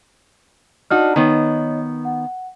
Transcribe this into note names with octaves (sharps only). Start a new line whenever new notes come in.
D4 D#4 F#4 F6
D#3 B3 D#4 C#5 D#5
F#5